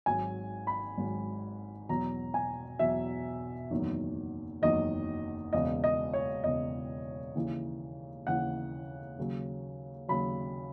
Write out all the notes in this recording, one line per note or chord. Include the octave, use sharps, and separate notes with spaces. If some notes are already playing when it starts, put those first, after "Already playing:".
G#1 G#2 F#3 G#5
B5
G#1 G#2 F#3
E2 B2 F#3 A#5
G#5
E2 B2 F#3 E5
F#1 E2 D#3 F#3
F#1 E2 D#3 F#3 D#5
E1 E2 C#3 D#5
D#5
C#5
E1 E2 C#3 D#5
D#2 C#3 E3
D#2 C#3 E3 F#5
D#2 C#3 F#3
D#2 C#3 F#3 B5